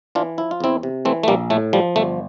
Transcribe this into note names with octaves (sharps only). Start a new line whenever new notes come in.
E3 D4 F4
F3 E4
F4
E2 C4 E4
C3
E3 A3 C4
A3
A#1 G3 A#3
A2 A3
F3 G3
G1 A3